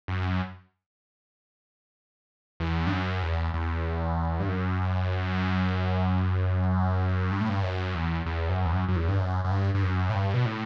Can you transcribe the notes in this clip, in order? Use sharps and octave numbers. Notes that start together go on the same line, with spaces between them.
F#2
E2
G2
F#2
E2
E2
G2
F#2
G2
A2
G2
F#2
E2
E2
F#2
E2
F#2
F#2
E2
G2
F#2
F#2
G2
G2
F#2
A2
G2
B2
A2